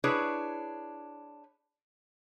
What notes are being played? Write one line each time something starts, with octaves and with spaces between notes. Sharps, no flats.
D4 E4 G#4 B4 C#5